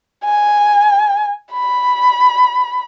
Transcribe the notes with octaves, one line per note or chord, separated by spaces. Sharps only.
G#5
B5